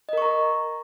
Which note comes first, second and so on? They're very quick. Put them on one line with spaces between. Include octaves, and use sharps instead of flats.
D#5 A#4 C#6 A#5